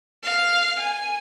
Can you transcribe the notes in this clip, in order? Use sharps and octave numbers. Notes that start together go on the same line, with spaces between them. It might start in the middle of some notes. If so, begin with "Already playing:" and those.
F5
G#5